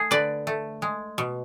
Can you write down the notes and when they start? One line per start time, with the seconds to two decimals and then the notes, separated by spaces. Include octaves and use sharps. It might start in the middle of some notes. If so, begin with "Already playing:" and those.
Already playing: A3 G#4
0.11 D3 B4 D5
0.47 A3
0.82 G#3
1.18 B2